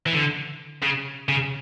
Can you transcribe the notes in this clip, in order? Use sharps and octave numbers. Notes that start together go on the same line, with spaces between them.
E3
D3
C#3
C#3